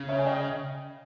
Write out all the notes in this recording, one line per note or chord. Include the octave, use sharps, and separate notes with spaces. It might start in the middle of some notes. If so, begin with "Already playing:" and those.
Already playing: C#3
C#5 E5
G#5
D#5 G5